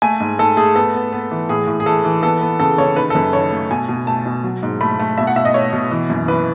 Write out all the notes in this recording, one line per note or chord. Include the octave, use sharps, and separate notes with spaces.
A3 G#5
G#2
G#2 A4
A3 G#4
B3 A4
B3
B3
E3
A2 G#4
A2
G#4
E3 A4
E3
B3 A4
B3
C#3 A4
C#3 C#5
D#3 B4
A4
F#2 B4
D#3 C#5
A3
B2 G#5
B2
A3 A5
B2
F#3
G#2
A3 B5
A3
B2 E5
F#5
B2 E5
D#5
A3 C#5
B2
E3
F#2
E3 B4